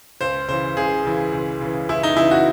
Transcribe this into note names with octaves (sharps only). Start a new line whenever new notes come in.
C#2 C5
C#3 E3 C5
C#2 G#4
C#3 E3
C#2
C#3 E3
C#2 E4
D#4
C#3 E3 E4
F#4